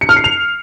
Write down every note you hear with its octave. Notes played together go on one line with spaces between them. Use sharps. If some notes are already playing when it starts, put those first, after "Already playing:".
C#7
F6
C7
F7